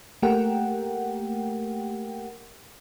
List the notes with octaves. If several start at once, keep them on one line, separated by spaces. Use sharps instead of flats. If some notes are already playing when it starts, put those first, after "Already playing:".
A3 A#3 G4 A#4 F#5 G5